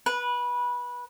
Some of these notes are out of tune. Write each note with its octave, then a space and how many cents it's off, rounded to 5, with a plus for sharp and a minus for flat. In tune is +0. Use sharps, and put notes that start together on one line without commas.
B4 -20